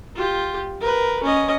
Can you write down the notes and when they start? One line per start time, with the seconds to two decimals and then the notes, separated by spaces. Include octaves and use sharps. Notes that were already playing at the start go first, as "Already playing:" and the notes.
0.16 F4 G4
0.81 A#4 B4
1.23 C#4 D#5